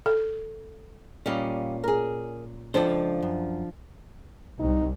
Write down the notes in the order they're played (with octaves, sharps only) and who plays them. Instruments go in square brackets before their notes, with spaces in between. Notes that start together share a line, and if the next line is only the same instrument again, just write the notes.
[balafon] A4
[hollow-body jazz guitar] A#2 C#4 [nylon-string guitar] G3 D#5 F5
[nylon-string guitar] G#4 A#4
[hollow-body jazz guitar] C#2 A4 C5 [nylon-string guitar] F3 D4
[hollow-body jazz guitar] F#2
[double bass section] C2 [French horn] D#4